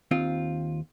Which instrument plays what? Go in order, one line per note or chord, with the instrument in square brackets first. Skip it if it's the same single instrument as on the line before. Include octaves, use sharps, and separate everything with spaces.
[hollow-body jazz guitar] D#2 C4 F4